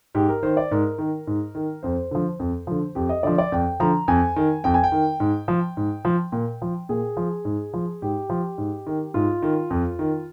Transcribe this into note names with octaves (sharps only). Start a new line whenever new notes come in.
G#2 G4
A#4
D#3 C5
D5
G#2 A#4
D#3
G#2
D#3
F2 C5
D3 F3
F2
D3 F3
F2 G4
D#5
D3 F3 D5
D5
F2 G5
D3 F3 A#5
F2 G#5
D#3
F2 G5
G#5
G5
D#3
G#2
F3
G#2
F3
A#2
F3
A#2 G#4
F3
G#2
F3
G#2 G4
F3
G#2
D#3
G#2 F4
D#3
F2
D#3